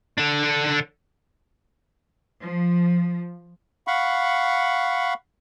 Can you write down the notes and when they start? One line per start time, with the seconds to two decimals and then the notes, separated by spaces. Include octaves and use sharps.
0.18 D3 D4
2.43 F3
3.87 F5 F#5 B5 C#6